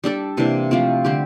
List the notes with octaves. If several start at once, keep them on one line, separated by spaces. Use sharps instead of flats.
G3 D4 A4 D5
C3 E3 A#3 D4
F3 A3 C4 F4
D3 G3 C4 G4